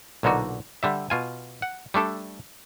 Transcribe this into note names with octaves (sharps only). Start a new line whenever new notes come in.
B1 A#2 D3 D#4 F#4
D3 G3 E5
B2 F4 G#5
F#5
G3 A3 D4 A4